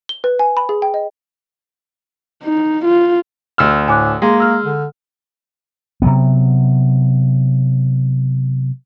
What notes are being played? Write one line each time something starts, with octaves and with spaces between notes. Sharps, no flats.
G7
B4
G#5
B5
G#4
G5
D#5
D#4
F4
D2 E6 F6
A2 G#5 D6 F#6
G#3 A#3 C6
E6 F6
D3
C3 F#3 B3